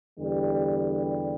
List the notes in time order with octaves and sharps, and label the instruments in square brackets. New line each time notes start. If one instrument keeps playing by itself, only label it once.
[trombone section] E2 D3 G3